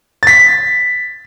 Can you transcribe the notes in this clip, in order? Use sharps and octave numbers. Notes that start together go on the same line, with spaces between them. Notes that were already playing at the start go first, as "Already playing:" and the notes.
A6 B6